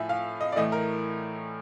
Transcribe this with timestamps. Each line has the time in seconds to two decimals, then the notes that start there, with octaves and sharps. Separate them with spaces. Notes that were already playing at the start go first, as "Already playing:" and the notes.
Already playing: A2 F3 E5 G#5
0.09 F5
0.41 D#5
0.52 D5
0.56 A2 E3 A3 D#5
0.72 A#4